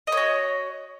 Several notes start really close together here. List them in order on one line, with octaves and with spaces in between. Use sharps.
D#5 C#5 F#4